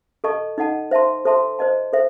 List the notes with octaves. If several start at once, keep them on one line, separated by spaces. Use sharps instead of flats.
A4 D#5 A5 C#6
D#4 A4 D#5 F#5 A5
C5 E5 A5 C6
A4 C5 E5 A5 C6
C5 D#5 A5
A4 C5 E5